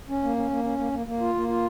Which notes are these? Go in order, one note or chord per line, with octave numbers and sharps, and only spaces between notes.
C#4
A#3
C#4
A#3
C#4
A#3
A#3
A#3
F4
A#3
F4